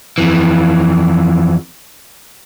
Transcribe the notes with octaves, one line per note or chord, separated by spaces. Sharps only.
F2 E3